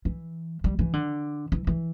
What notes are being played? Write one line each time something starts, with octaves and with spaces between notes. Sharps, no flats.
E3
G3
E3
D3
E3
E3